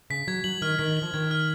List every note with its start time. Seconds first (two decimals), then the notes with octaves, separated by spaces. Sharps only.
0.10 C#3 B6
0.28 F#3 G#6
0.44 F#3 F#7
0.62 D#3 F6
0.79 D#3 B6
0.97 F#7
1.02 F3
1.14 D#3 G#6
1.31 F6